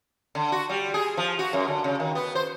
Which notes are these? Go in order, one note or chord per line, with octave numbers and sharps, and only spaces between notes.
D3
F#4
G3
G#4
F3
F#4
F#2
D3
C#3
D#3
B3
C5